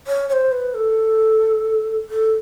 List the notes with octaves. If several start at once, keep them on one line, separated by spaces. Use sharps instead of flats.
C#5
C#5
C5
B4
A4
A4